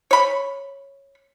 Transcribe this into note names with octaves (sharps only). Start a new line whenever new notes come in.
C#5 B5